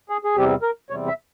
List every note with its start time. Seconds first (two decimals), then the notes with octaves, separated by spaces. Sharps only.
0.09 G#4
0.24 G#4
0.36 E2 C3 G3 C4 G4
0.62 A#4
0.90 E2 C3 G3 C4 C#5
1.08 E5